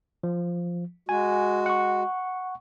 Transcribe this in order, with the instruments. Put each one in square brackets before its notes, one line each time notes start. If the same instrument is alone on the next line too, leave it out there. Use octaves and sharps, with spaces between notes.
[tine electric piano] F3
[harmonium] G#3 F#4 [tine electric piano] G#5
[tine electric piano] F#5 C#6